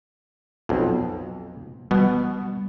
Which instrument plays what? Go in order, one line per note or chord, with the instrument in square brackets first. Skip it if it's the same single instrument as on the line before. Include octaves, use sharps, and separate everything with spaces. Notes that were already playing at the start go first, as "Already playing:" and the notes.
[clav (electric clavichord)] B1 F2
[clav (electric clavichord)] B2 B3 [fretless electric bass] G3